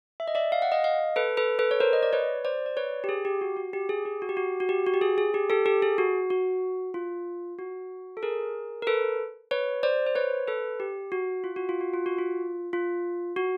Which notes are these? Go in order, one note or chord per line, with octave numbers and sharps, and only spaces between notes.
E5
D#5
D5 E5
F5
F#5
D#5 F5
D#5 F5
A4 B4
A4 B4
A4 B4
C#5
A#4 C5
D#5
D5
B4 C#5
C5 D5
D5
B4 C#5
G4
G#4
G4
F#4
F#4
G4
G#4
G4
F#4
G4
F#4
F#4
G4
F#4
G4
G#4
G#4
G4
G4 A4
G4 A4
G#4
F#4
F#4
F4
F#4
A4
G#4 A#4
A#4
A4 B4
B4 C#5
C5 D5
C5
B4 C#5
A4 B4
G4
F#4
F4
F#4
F4
F#4
F4
F#4
F4
F4
F#4